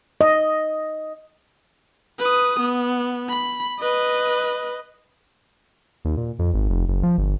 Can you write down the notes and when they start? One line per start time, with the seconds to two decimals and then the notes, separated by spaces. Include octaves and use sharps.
0.21 D#5
2.19 B4 D#6
2.60 B3
3.29 B5
3.79 B4 D#5
6.05 D#2
6.17 A#2
6.39 F2
6.54 G#1
6.69 F1
6.89 F#1
7.03 F3
7.18 G1